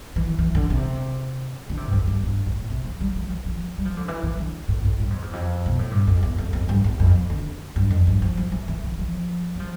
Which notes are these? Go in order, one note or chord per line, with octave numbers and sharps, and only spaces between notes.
E3
E3
D3
C3
D3
C3
G2
F2
G2
G2
A2
C3
E3
G3
F3
E3
F3
G3
F3
D3
E3
E3
D3
A2
A2
G2
F2
E2
F2
B2
A2
G2
F2
E2
F2
F2
G2
E2
F2
D3
G2
F2
G2
F3
F3
E3
E3
E3
F3
G3
F3